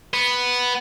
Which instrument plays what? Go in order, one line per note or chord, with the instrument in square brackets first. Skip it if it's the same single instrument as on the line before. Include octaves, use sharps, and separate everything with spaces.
[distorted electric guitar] B3